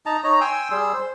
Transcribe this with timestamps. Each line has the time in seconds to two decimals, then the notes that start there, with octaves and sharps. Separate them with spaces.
0.06 D#4 A5 A#5
0.24 D#4 C#5 A#5
0.41 G5 G#5 C6 E6
0.71 G3 G#4 C6 E6
0.94 C5